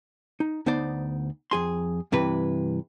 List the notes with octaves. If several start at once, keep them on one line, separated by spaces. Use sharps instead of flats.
D#4
D2 B3 D#4 C5 D5
F2 G#4 C6
G2 C3 E3 B4